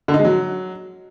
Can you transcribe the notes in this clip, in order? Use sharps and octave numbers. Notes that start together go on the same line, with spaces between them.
D3
D#4
G#3
F#3